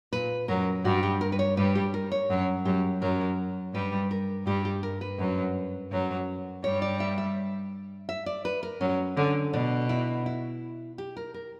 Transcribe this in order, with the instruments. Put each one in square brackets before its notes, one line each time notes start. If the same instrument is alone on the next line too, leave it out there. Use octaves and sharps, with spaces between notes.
[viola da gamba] A#2 [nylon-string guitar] B4
[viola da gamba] F#2 F#3 [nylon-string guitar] A#4
[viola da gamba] G2 G3 [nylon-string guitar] F#4
[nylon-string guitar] G4
A#4
B4
C#5
[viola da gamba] G2 G3 [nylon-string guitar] B4
[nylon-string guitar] G4
A#4
C#5
[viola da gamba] F#2 F#3
[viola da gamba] F#2 F#3 [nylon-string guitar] G4
[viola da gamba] F#2 F#3 [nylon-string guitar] A#4
[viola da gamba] G2 G3 [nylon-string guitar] B4
[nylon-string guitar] A#4
[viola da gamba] G2 G3 [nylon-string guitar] G4
[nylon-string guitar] G4
A#4
B4
[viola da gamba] F#2 F#3
F#2 F#3
[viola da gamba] G2 G3 [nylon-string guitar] C#5
[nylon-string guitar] D5
E5
E5
E5
D5
B4
A#4
[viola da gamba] F#2 F#3 [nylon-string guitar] C#4
[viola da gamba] D3 [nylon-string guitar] C#4
[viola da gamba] B2 [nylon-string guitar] D4
[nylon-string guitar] E4
E4
G4
A#4
A#4